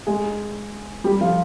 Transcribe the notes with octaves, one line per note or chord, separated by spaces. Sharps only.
G#3 G#4
G3 G4
F3 F4